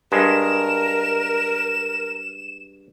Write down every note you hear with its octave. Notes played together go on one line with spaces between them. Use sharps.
G2 G#3 A#4 E7